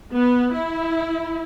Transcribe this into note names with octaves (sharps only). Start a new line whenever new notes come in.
B3
E4